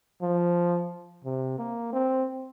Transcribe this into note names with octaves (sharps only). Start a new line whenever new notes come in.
F3
C3
A#3
C4